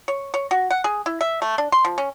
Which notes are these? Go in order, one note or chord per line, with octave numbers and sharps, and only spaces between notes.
C#5
C#5
F#4
F#5
G#4
E4
E5
A3
D4
C6
F3
C#4